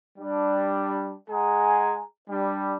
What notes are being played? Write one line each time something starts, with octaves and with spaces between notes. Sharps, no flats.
G3 D4
G#3 G#4 F#5 G#5 A#5
G3 D4